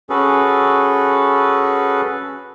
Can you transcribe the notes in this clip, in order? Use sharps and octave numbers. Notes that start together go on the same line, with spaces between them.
C#4 F#4 G#4 A4 B4